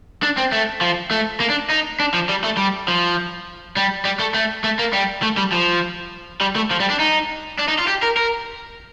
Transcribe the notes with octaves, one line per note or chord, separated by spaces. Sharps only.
D4
C4
A3
F3
A3
A#3
D4
D#4
D4
F3
G3
A3
G3
F3
G3
G3
A3
A3
A3
A#3
G3
A3
G3
F3
G3
A3
F3
G3
D4
D#4
D4
D#4
F4
G4
A#4
A#4